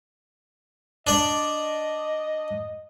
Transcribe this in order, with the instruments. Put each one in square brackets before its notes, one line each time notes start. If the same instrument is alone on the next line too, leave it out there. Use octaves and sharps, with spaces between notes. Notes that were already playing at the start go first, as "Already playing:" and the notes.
[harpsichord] D4 D5 [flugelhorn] D#5